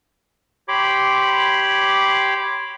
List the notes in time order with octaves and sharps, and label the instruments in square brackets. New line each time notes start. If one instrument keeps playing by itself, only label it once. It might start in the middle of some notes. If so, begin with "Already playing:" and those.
[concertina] G4 C#5 B5 C6 D6